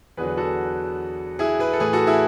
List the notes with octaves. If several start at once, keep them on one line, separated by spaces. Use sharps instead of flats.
E2 D3 F#3 G#4 B4
F#4 A4
E4 G#4
G#4 B4
A4
A2 E3 G#4 B4
F#4 A4
E4 G#4